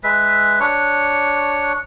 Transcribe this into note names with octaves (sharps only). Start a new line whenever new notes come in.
G#3 B4 E5
D4 C#5